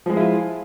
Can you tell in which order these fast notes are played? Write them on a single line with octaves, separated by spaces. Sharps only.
F3 G#3 G#4 E4 F4